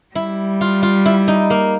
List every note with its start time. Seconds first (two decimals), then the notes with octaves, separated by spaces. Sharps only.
0.15 G3 E4
0.61 F4
0.83 F4
1.06 E4
1.28 D#4
1.50 A#3